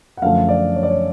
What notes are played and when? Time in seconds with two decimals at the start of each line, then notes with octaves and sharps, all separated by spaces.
0.17 F#5
0.22 F#2 D3 F3 A3 F5
0.49 D5
0.76 C#5
0.83 D5
0.90 C#5